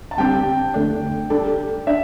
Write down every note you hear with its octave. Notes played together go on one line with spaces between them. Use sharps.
A5
D3 G3 C4 G4 D5 G5
E2 D3 A3 D4
G3 D4 A4 D5
D4 E5